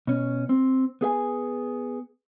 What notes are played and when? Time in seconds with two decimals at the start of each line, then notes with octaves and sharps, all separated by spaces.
0.07 B2 C#4
0.49 C4
1.01 B3 G#4 E5 G#5